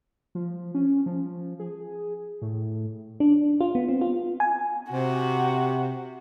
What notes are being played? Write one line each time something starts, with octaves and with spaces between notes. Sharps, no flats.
F3
C#4
F3
G#4
A2
D4
F4
B3
C4
F4
G#5
C3 F#4